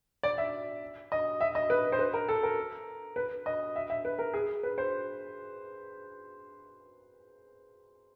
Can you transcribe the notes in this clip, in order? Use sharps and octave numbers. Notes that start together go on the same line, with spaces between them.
D5
E5
D#5
E5
D#5
B4
C5
B4
A#4
A4
A#4
B4
D#5
E5
E5
B4
A#4
G#4
B4
C5